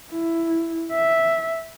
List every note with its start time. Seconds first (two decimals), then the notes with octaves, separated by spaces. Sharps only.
0.12 E4
0.92 E5